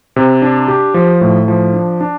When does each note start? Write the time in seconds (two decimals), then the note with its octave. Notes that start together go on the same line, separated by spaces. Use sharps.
0.16 C3
0.42 D4
0.68 G4
0.94 F3
1.21 A2
1.48 F3
1.73 D4
2.01 D4